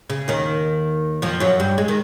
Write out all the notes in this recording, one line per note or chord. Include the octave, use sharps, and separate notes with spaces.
C#3
D#2 D#3
F2 F3
F#2 F#3
G2 G3
G#3
D#3